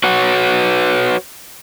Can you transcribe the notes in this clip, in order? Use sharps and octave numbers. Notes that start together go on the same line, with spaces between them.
F#4 B4 C#5 F#5